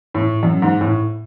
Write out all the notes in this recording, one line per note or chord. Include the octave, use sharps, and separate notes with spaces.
A2
F#2
G#2
A2